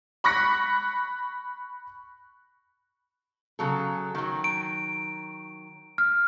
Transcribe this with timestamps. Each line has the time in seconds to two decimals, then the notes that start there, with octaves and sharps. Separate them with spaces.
0.24 B5 C#6 F#6 A#6 B6 C#7
3.59 C#3 F#3 A4
4.15 D#3 F#3
4.44 D7
5.98 F6